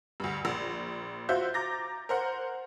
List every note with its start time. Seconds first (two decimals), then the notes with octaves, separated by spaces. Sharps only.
0.20 D2 G2
0.45 A#1
1.29 F4 F#4 C5 E5 G6
1.54 A#5 D6 G6 A6 A#6
2.09 A#4 C5 F#5